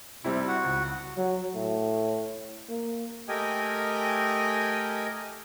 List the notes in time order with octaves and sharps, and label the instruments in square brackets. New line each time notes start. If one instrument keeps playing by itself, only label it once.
[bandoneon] C3 [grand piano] G3 C4 E4
[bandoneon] F#4 F#5
[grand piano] C#2
[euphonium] F#3
A2
A#3
[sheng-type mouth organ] A3 G4 A#4 D#5 G5 G#5